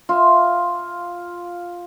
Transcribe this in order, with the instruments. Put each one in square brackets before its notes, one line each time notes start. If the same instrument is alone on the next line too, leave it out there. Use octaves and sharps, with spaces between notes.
[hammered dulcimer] F4 E5